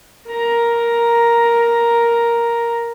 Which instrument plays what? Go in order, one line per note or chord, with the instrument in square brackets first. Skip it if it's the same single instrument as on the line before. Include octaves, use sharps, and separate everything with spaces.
[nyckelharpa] A#4 A#5